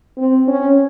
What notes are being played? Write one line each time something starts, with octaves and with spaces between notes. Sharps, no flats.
C4
C#4